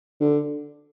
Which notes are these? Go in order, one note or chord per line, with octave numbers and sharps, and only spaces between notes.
D3